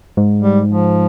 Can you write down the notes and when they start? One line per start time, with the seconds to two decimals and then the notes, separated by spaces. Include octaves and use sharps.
0.17 G#2
0.43 G3
0.68 F3